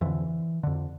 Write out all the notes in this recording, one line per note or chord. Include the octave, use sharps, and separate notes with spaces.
F2 D3 E3
F2 D3